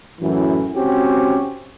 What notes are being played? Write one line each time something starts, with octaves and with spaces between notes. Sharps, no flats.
F#2 A2 E3
C#2 C4 C#4 F#4 G4